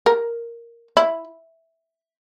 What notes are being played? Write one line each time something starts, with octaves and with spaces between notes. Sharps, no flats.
A#4
E4